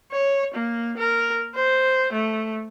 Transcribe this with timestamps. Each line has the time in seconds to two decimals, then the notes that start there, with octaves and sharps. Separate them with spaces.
0.12 C#5
0.54 A#3
0.98 A#4
1.55 C5
2.13 A3